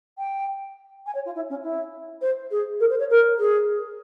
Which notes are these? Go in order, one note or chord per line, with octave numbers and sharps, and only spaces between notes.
G5
G#5
C#5
F4
E4
C#4
E4
C5
G#4
A#4
C5
C#5
A#4
G#4